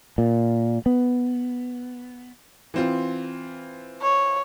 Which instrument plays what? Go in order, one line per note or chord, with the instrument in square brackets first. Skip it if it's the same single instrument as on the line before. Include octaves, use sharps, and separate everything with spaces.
[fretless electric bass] A#2
B3
[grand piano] E3 C4 F4
[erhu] C#5